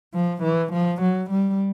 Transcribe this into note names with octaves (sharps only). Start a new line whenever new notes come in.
F3
E3
F3
F#3
G3